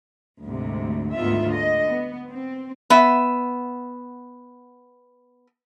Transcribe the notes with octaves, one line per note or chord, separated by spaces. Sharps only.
D2 G#2 C3
D2 G#2 D#3 B3 F4 E5
D3 D#5
B3
C4
B3 E5